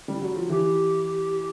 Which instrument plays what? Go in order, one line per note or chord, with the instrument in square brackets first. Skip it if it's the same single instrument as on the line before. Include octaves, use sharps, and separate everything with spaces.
[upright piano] G3
F#3
F3
[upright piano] E3 [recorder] G4